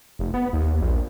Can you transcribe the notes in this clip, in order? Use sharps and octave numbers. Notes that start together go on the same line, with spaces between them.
F1
B3
D#2
A#1